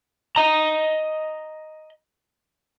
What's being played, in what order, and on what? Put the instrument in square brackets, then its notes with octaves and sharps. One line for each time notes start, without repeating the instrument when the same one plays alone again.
[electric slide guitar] D#5 A#5